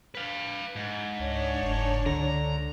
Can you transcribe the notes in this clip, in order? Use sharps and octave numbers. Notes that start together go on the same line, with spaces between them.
B4 F5
G#2
C#2 D4 C#5
F#1
C#2 D3 A#5